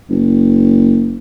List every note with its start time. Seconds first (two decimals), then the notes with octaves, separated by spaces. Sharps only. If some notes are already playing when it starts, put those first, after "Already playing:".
0.10 F#1